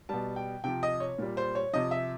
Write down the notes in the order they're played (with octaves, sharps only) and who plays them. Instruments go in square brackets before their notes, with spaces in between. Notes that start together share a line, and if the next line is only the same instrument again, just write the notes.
[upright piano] B2 G3 A5
G5
C3 F3 G5
D#5
C#5
A#2 G3
C5
C#5
C3 F3 D#5
E5